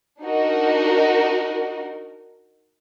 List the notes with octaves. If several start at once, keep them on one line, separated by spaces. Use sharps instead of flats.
D4 D#4 F#4 A#4